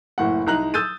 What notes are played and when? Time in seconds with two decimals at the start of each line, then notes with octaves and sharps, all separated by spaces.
0.18 F#1 A2 F#5
0.47 C2 D#4 A#5 F#6 F#7
0.74 D#6 E6 G6 A6 D#7